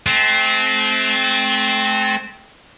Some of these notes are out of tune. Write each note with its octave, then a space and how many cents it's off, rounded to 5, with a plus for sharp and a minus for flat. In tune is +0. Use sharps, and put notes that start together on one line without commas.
A3 -35 C4 +0